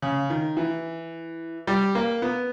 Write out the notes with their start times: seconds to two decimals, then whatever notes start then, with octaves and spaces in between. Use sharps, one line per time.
0.02 C#3
0.30 D#3
0.57 E3
1.67 G3
1.95 A#3
2.22 B3